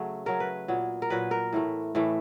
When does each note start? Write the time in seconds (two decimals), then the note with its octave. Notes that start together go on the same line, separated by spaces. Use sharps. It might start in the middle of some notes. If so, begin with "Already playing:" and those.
Already playing: C#3 F#3 A3
0.26 C#3 F#3 A3 A#4
0.40 B4
0.68 A#2 F#3 B3
1.02 A#4
1.10 A#2 F#3 B3 B4
1.31 A#4
1.53 A2 E3 A3
1.95 A2 E3 A3